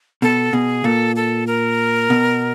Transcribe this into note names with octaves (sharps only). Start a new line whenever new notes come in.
B2 A4
B2 G#4
A#2 A4
A4
A#4
B2